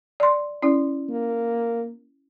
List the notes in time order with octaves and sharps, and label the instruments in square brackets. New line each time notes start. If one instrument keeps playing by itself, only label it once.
[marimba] D5 C6
C#4 E4 D5
[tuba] A#3